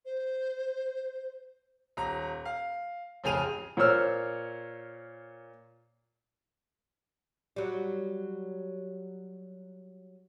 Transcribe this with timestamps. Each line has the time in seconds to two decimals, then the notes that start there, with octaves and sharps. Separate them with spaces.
0.06 C5
1.97 D#1 A#5
2.45 F5
3.24 A1 F2 C#3 G#4 D#7 F7
3.77 A#2 C5 C#5 E6 F6
7.56 F#3 G3